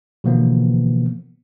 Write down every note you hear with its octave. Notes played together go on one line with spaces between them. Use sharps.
B2 D3 E3 F3 A#3 B3